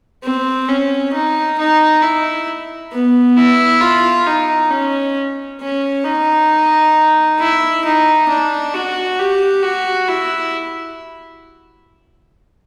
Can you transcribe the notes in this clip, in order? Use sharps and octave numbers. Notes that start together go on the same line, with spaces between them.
C4
C#4
D#4
D#4
E4
B3
E4
F4
D#4
C#4
C#4
D#4
E4
D#4
D4
F#4
G4
F#4
E4